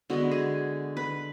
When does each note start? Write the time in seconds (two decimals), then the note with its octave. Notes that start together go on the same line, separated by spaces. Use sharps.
0.10 D3 G#3 B3 F#4
0.31 G#4
0.97 B4